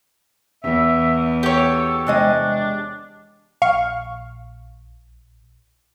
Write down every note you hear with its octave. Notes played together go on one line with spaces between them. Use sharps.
E2 E5
G4 A4 C#5
C3 G#3 D4 D#5
A#1 F5 C#6